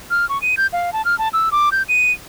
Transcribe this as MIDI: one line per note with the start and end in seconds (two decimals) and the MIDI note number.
0.11 0.28 89
0.29 0.40 85
0.42 0.55 99
0.57 0.67 91
0.73 0.90 77
0.93 1.04 81
1.05 1.17 89
1.19 1.29 81
1.33 1.49 88
1.52 1.69 86
1.72 1.83 91
1.89 2.12 99